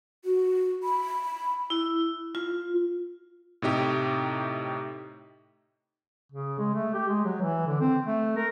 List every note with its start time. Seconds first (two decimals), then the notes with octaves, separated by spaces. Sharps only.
0.25 F#4
0.83 B5
1.70 E4
2.35 F4
3.62 A2 C3 D#4 G4
6.32 C#3
6.58 G#3
6.75 A3
6.94 G4
7.08 G#3
7.25 F#3
7.42 E3
7.67 D3
7.80 C4
8.06 A3
8.37 A#4